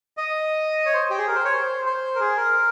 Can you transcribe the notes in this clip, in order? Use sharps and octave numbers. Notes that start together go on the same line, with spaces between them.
D#5
C#5
C5
G4
G#4
A#4
C5
C#5
C5
C5
A#4
G#4
A#4